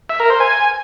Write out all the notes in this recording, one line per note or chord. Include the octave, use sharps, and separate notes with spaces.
E5
A#4
C5
G#5